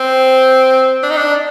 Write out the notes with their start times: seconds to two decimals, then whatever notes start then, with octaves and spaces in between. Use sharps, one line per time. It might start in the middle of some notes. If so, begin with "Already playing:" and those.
Already playing: C4
1.03 D4
1.10 D#4
1.17 D4